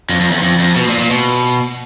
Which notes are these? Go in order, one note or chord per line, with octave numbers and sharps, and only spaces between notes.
F2
F2
E2
F2
F2
B2
A#2
A#2
B2